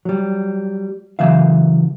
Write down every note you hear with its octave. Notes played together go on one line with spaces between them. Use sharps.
F#3 G3
C#3 E3 F#3 E5 F5